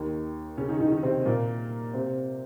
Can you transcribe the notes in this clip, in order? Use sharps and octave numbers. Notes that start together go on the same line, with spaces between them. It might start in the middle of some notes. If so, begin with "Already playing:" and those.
Already playing: D#2 D#3
C#3 C#4
D#3 D#4
D#3 D#4
D#3 D#4
C3 C4
A#2 A#3
C3 C4